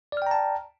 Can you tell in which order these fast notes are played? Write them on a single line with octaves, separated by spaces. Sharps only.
D5 F6 G5 A#5 A5